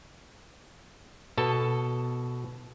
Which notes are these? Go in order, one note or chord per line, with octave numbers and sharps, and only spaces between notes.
B2 A4 A5